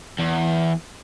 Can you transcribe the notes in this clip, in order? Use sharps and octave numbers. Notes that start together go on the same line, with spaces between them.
E2